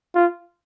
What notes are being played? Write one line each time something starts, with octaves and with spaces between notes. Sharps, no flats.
F4